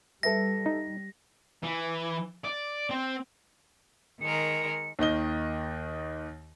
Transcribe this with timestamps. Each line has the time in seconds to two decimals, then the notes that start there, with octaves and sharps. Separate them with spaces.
0.23 G3 A4 B4 E5 A#6
0.66 D#4
1.63 E3
2.44 D5
2.90 C4
4.21 D#3 G#3 A#4 C#7
4.99 D#2 D#3 D#5 G7